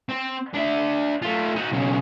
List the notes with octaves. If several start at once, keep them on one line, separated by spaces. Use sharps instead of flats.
C4
D4 E5
A3 F4
D#4 F#4
B1 C#3